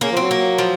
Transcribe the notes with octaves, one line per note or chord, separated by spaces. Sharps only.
C#3 A#3
F3
F#3 C4
A#3
F3